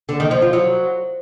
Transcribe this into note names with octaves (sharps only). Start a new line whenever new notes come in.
D3
D#3
F3
F4
F#3